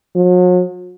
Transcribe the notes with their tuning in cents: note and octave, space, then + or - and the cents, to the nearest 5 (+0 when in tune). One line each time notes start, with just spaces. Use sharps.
F#3 -40